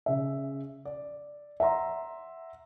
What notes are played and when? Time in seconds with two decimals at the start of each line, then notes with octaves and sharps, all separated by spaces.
0.06 C#3 E5
0.85 D5
1.60 E5 F#5 A#5 C6